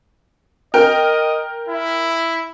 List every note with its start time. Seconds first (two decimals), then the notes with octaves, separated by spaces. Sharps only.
0.74 A#4 D#5 G5
1.69 E4